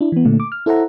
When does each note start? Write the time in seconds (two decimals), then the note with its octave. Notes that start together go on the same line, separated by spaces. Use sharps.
0.01 D4 E4
0.12 E3 B3
0.25 A#2 D3 A3
0.40 D6
0.52 F6
0.66 E4 A4 C5 E5 F#5 A#5